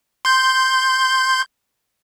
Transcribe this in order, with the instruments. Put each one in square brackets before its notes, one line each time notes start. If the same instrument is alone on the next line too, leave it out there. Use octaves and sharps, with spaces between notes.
[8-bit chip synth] C6 G6